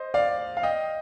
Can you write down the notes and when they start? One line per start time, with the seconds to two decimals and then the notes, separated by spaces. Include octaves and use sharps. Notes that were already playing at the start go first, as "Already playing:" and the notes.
Already playing: C5 D#5
0.14 D5 F5
0.57 F5
0.63 D#5 G5